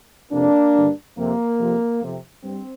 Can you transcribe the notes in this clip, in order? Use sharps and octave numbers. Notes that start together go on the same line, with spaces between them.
F2 C3 A#3 D4
G2 D3
F2 C3 A#3
F2 C3
F2 C3
G2 C4